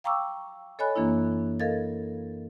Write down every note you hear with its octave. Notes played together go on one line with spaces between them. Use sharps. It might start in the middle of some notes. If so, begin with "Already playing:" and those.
F5 G5 A#5 C#6 D6 E6
A4 C#5 D#5 G#5 B5 F#6
F#2 E3 A#3 D4 E4
A4 A#4 D#5 F5 G#6 A6